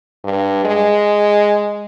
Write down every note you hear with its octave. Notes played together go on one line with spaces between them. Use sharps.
G2
G#3